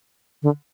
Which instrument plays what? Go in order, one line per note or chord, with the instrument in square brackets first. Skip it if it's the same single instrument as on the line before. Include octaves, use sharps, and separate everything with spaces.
[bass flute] D3